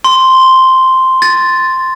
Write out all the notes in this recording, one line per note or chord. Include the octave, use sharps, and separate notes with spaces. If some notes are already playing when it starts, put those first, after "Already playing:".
C6
A6